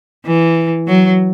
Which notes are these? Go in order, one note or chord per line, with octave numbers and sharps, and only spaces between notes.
E3
F#3